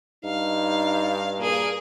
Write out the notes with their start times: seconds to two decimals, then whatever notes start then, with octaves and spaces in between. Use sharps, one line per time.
0.25 G2 D#4 F5
1.39 A#2 A#3 G#4